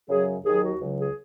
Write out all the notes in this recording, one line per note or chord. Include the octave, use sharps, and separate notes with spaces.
F#2 C#3 F#3 G#4
D#2 D#3 F#3 G#4
F#4
C#2 C#3 F#3
G#4